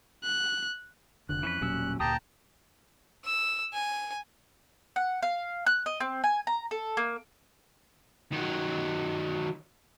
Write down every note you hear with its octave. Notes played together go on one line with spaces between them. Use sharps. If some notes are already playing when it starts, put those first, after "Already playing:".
F#6
F1 D3 F#6
F2 E3 C#4 B4
E1 A#2 F#3 G3 C#4 E6
D2 A#2 A#3 G4 G5 A5 A#5 D#6
E6
G#5
F#5
F5
F#6
D#5
C4
G#5
A#5
A4
A#3
D#3 F#3